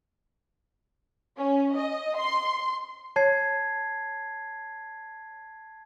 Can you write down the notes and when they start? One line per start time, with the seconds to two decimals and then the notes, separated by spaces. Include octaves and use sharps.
1.38 C#4
1.77 D#5
2.18 C6
3.16 C#5 A5 G#6 C7